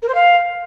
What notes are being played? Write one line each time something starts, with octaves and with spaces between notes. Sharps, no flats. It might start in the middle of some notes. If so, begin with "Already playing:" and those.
A#4
C5
F5